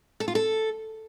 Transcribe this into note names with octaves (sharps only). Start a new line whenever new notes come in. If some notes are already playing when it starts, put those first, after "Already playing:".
A4
F4
A4